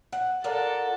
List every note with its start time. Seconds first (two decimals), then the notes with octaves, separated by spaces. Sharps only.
0.13 F#5
0.44 F4 A4 A#4 D5 F#5